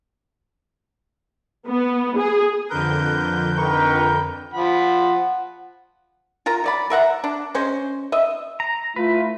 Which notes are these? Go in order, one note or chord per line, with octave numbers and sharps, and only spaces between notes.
B3
G#4
F2 D3 A#4 B4 G6
D#4 A#4 B4 G5 C#6
F3 F#5 B5
F4 A#4 A#5
F#3 D5 B5
A#4 E5 F#5 A#5
D4
G#3 C#4 C5
D#5 E5
A#5
A3 E4 F4 B4